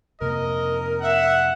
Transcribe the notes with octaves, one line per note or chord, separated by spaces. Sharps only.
F2 C3 A#3 A#4 D#5
E5 F#5